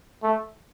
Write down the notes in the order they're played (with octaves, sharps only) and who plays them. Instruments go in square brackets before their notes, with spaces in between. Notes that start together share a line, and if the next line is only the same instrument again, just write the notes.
[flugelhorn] A3